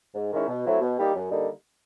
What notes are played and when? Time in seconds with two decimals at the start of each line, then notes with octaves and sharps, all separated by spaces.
0.14 G#2
0.31 D#3 G#3 C#4 E4
0.48 B2
0.64 F#3 A3 C4 E4
0.81 B2
0.97 G3 A#3 D#4 G4
1.13 F#2
1.30 D3 G3 A#3 D#4